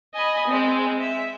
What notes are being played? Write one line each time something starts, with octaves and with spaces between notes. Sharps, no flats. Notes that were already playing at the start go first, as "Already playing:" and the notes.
D#5 G#5 B5
G#3 C4
E5